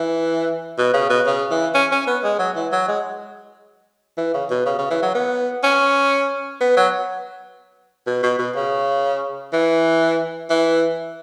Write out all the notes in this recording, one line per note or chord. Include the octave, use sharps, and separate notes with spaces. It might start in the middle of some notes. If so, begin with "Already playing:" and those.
Already playing: E3
B2
C#3
B2
C#3
E3
C#4
C#4
B3
G#3
F#3
E3
F#3
G#3
E3
C#3
B2
C#3
C#3
E3
F#3
B3
C#4
B3
F#3
B2
B2
B2
C#3
E3
E3